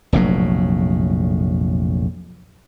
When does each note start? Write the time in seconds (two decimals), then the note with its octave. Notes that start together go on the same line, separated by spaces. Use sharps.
0.13 F1 A#1 A2 F#3